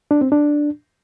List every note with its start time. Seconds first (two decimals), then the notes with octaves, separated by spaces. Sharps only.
0.11 D4
0.21 C4
0.32 D4